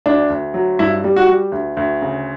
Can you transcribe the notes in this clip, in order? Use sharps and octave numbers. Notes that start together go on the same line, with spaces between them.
D2 D4
D2
F#3
G2 E4
G3
F#4
G3
D2
D2
C#3